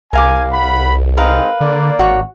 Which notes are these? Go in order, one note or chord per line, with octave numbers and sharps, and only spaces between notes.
C2 A#4 F5 G#5 D6
F#5 B5
G#3 C4 D#4 A#4 B4 F5
D3 A#3 D5
G#1 F#4 C#5